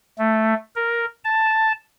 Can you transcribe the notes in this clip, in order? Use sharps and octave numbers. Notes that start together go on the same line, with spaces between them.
A3
A#4
A5